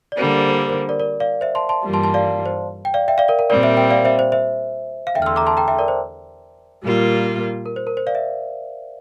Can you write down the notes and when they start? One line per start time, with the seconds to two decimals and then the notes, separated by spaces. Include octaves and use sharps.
0.12 D5
0.17 D3 G3 A#3 C5
0.37 C5
0.48 C5
0.58 A#4
0.69 C5
0.89 A#4 D5
1.00 A#4 D5
1.20 D5 F5
1.41 C5 E5
1.55 A5 C6
1.69 A5 C6
1.83 G2 E3 G3 A#3 F4
1.93 A5 C6
2.04 A5 C6
2.14 D5 F5
2.46 C5
2.85 G5
2.94 D5 F5
3.08 E5 G5
3.18 D5 F5
3.28 A#4 D5
3.39 A#4
3.50 A#2 G3 C4 A#4 D5
3.63 C5 E5
3.77 E5 G5
3.91 D5 F5
4.05 C5 E5
4.19 C5
4.32 C5 E5
5.07 F5
5.15 E2 D3 A3 E5 G5
5.22 F6
5.26 C6 E6
5.36 A#5 D6
5.47 A5 C6
5.57 G5 A#5
5.68 E5 G5
5.79 A#4 D5
5.88 C5
6.83 A#2 G3 A#3 F4
7.66 A#4
7.76 C5
7.87 A#4
7.97 C5
8.07 D5 F5
8.15 E5